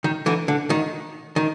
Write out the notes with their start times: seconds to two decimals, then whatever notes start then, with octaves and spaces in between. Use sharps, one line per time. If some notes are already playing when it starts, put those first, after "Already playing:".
0.04 D#3
0.26 D3 E3
0.48 D3
0.70 D#3
1.36 D#3